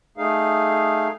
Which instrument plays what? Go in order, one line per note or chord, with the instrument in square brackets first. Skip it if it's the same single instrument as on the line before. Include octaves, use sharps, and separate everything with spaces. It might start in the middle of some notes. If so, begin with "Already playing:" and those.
[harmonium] A3 D#4 G#4 F5